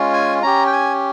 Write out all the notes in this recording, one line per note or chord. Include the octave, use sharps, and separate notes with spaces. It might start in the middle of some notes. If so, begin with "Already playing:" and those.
Already playing: G#3 C#4 F4
G#5
C#4 G4 A#5
G5
G#5